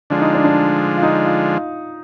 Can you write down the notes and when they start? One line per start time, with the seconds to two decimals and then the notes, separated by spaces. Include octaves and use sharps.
0.10 D3 F3 G#3 D4
0.21 D#4
0.34 D4
0.44 D4
0.97 F4
1.03 D#4
1.25 F4